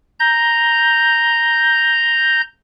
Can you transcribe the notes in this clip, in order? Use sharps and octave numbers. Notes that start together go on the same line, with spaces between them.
A#5 G6